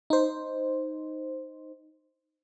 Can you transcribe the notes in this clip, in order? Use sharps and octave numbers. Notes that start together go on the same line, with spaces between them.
D#4 C5